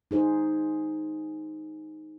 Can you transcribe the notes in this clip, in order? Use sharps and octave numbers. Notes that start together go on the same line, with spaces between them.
D#4 G#4 C5